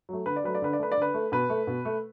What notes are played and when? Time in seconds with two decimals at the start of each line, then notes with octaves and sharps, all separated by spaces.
0.09 F#3 A3
0.26 D3 B4
0.36 D5
0.44 F#3 A3 B4
0.55 D5
0.62 D3 B4
0.73 D5
0.79 A3 B4
0.92 D5
0.97 D3 B4
1.14 A3
1.32 B2 B4
1.49 A3
1.67 B2
1.85 A3